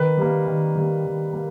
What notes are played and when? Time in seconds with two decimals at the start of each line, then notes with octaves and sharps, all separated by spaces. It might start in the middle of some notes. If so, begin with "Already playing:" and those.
Already playing: D#3 B4
0.17 G3 A#3
0.47 D#3
0.75 G3 A#3
1.05 D#3
1.33 G3 A#3